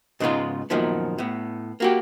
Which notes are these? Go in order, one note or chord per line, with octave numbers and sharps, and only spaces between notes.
G#2 C#3 G#3 B3 D#4 F4
F#2 A#2 D#3 F3 B3
A2 B3
A#3 F#4 G4